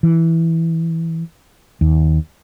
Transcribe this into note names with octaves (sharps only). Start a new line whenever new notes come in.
E3
D#2